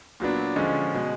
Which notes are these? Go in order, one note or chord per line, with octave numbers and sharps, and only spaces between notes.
A#2 F#3 B3 D4
D3 F3 G#3 C#4
B2 G#3